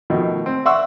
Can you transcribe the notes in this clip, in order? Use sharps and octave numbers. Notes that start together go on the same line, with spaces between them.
B2 D#3 F3 A3
C4
D5 E5 F#5 C6 C#6 E6